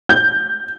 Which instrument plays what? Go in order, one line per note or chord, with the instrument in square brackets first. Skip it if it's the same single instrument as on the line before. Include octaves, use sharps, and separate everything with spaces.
[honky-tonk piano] G6